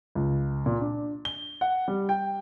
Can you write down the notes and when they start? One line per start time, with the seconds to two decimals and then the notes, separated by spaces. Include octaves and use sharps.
0.15 C#2
0.66 A#2
0.81 D4
1.25 G7
1.61 F#5
1.88 G3
2.09 G5